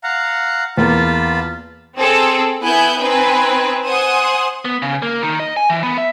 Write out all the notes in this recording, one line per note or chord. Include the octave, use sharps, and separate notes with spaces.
F5 F#5 A#5
E2 A#3 F4 A5 B5
C4 G#4 A4
B3 E4 G#5 F#6 G6
C4 D#4 B4 G#5
C5 F#5 G#5 C6 D#6
B3
C#3
A#3
D#3
D#5
G#5
E3
B3
E5